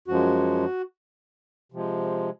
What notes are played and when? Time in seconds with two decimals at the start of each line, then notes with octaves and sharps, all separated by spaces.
0.08 F#2 F3 G#3 F#4
1.72 C3 F3 G#3